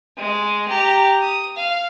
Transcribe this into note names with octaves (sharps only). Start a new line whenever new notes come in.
G#3
G4 A#5
D#6
F5